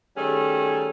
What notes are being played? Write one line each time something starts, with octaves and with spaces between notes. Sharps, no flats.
D#3 G3 A3 C#4 G#4